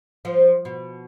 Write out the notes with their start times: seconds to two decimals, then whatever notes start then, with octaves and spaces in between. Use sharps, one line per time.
0.25 F3
0.65 B2